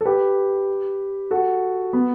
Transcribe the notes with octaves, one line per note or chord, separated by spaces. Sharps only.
A4
G4 B4
F#4 A4
B3